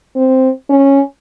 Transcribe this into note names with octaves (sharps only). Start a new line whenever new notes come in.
C4
C#4